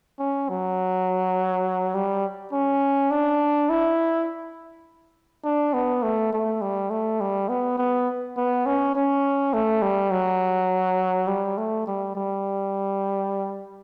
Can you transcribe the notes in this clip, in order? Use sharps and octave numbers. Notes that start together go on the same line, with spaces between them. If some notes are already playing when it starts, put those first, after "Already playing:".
C#4
F#3
G3
C#4
D4
E4
D4
B3
A3
A3
G3
A3
G3
B3
B3
B3
C#4
C#4
A3
G3
F#3
G3
A3
G3
G3